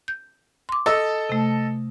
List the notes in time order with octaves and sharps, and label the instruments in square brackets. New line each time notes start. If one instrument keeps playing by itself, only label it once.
[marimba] G6
C6 D6
[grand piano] A4 D#5 A5 [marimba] E6
[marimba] C3 A3